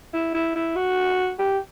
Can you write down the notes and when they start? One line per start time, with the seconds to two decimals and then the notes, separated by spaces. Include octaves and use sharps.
0.13 E4
0.34 E4
0.55 E4
0.75 F#4
1.39 G4